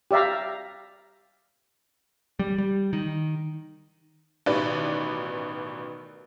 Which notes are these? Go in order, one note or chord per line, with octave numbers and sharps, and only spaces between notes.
G4 D5 E5 F5 A#5
G3
G3
D#3
A1 B2 D#3 B4 D5